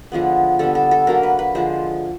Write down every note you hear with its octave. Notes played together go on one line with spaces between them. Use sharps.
D3 F3 G#3 B3
D3 G3 B3 A4
A4
A4
D3 F#3 A#3 A#4
B4
B4
D3 F3 G#3 C5